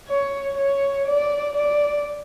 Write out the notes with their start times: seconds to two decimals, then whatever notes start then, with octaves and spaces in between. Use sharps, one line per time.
0.08 C#5
0.57 C#5
1.07 D5
1.57 D5